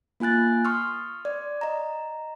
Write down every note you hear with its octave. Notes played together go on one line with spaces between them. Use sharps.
A#3 F4 G#5 F#6 A6
C6 C#6 D#6 F6
D5
D#5 A#5